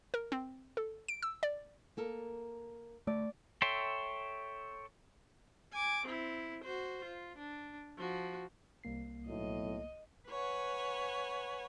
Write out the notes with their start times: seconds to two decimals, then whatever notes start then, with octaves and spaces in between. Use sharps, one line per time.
0.14 A#4
0.32 C4
0.77 A4
1.08 D7
1.23 E6
1.43 D5
1.97 A#3 A4 A#4
3.07 D2 A3 D5
3.62 A4 C#5 E5 G5 C6
5.73 G#5 D6
6.06 C4 E4
6.64 F#4 C5
7.05 F4
7.38 D4
7.98 F3 F#4
8.84 C2 A#3 C7
9.28 B1 A2 D#5
10.30 B4 C#5 F#5 G#5